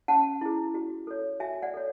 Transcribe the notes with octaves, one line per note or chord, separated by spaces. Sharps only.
C#4 F#5 A5
E4 G#4
F#4
A4 C#5
F#4 E5 G#5
D5 F#5
A4 C#5